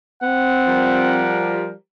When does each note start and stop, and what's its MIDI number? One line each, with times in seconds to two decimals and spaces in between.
0.22 1.34 60
0.22 1.59 78
0.67 1.72 53
0.67 1.72 55
0.67 1.72 70